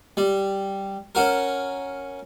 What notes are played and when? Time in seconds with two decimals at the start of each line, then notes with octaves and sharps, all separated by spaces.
0.17 G3
1.15 C#4 F#4 A#4